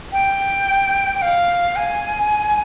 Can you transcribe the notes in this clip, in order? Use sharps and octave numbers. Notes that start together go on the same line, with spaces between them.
G5
G5
F5
G#5